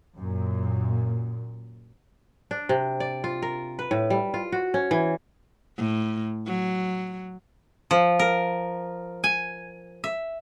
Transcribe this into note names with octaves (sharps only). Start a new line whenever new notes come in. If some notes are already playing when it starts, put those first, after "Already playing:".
F#2 A#2
D4
C3
D5
F4
A#4
B4
A2
G3
F4
F#4
C#4
E3
A2
F#3
F3
A#4
G#5
E5